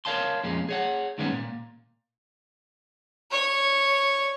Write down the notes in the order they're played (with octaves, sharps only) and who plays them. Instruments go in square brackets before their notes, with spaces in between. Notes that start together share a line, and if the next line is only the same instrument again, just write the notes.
[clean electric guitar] A#4 C#5 F5 A5 C6
F2 A#2 G#3 C#4
G#4 C#5 F#5
G2 D#3 G#3 B3 C#4
A#2
[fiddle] C#5